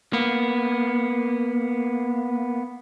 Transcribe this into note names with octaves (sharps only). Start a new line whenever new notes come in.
A#3 B3